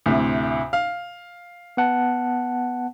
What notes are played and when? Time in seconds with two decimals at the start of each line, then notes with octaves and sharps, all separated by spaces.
0.06 D2 A2 C3
0.73 F5
1.77 B3 F#5 A5